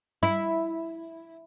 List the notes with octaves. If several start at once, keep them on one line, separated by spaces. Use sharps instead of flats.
E4